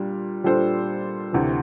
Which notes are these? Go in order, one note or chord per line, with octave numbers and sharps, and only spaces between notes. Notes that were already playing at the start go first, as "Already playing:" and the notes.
Already playing: A#2 G3 D4
A#2 G3 D4 A4 C5
D2 C3 E3